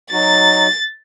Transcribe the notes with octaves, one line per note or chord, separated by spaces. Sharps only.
F#3 D#4 F#4 A6